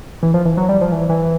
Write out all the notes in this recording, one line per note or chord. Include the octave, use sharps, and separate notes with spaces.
E3
F3
E3
F#3
G3
F3
E3
E3